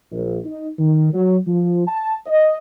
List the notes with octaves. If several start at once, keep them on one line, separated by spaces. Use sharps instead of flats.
A#1
D#4
D#3
F#3
F3
A5
D#5